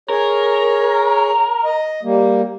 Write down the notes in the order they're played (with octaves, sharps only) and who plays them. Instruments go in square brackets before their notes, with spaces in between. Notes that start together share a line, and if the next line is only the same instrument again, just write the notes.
[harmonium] G#4 C#5 [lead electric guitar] A#4
[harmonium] D#5
G3 A#3